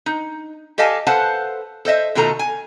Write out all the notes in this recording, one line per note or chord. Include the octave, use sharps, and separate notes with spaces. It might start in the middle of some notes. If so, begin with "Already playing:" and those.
D#4
G4 A4 D#5 F5 G#5 A5
A4 B4 C5 F5 F#5 A5
A4 C5 D#5 E5
B2 D#3 A3 F4 A4 A#5
G#5